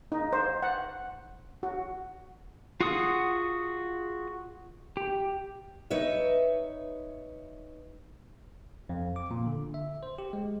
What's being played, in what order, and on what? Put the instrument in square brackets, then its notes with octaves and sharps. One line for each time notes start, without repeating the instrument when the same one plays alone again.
[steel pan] D#4
C5
F#5
F#4
[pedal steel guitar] F4 F#4 G#4 F#5 D#6
G4
[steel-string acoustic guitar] D#4 B4 C#5 E5
[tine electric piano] F2
D6
A#2
D3
E5
C5
G4
G#3